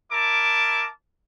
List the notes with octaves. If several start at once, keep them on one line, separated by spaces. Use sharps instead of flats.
E4 A#4 A5 D6